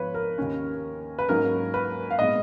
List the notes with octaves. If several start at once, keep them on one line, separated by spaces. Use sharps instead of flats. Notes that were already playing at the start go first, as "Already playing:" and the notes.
Already playing: G#2 F3 B3 B4 C#5
A#4
D#2 D#3 A#3 C#4
B4
G#2 F#3 A#3 C#4 A#4
B4
F5
A#2 G#3 B3 D#5